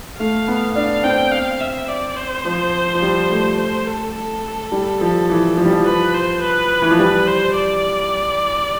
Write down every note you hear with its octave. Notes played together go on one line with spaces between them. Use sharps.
A3 F5
B3
D4 F5
C4 G5
F5
E5
D5
C5
F3
F3
G3
A3
C5
A4
A4
G3
F3
E3
F3
G3
F3
B4
C5
B4
E3
F3
G3 B4
C5
D5